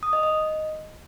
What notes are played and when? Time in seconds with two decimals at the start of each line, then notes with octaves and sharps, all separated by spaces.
0.03 D#6
0.13 D#5
0.23 D#5